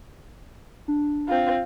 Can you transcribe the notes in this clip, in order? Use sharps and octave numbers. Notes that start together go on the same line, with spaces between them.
D4
C4 F4